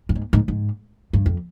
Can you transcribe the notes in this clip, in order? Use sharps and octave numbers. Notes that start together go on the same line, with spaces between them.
G2
G#2
G#2
G#2
G2
F2